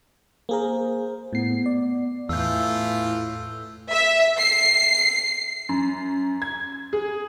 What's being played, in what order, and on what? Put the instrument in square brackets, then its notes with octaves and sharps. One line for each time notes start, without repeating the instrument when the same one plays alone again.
[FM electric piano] A#3 G#4 A#4 [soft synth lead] C5
[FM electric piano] A2 C7 [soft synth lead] B3
[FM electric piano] D5
[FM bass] E2 [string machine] A2 [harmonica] E3 A3 F4 [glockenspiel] E6 G6
[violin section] E5
C7
[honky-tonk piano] F#2
G#6
G#4